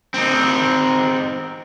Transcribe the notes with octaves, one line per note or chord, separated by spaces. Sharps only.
C4 D#4